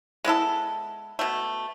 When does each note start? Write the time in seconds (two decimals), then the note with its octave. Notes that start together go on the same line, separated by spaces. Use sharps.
0.24 G#3 B3 E4 A4
1.19 B2 A3